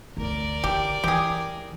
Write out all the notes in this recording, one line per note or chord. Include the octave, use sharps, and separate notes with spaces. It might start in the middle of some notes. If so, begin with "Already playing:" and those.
D2 A#4 D5
D3 G4
E3 G4 G#4